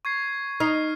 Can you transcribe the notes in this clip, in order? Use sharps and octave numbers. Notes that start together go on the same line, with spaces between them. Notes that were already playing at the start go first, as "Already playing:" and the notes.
C#6 G#6 C7
D#4 F6 C7